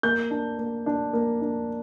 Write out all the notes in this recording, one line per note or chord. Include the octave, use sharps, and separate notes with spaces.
A#3 G6
D4
A#3
D4
A#3
D4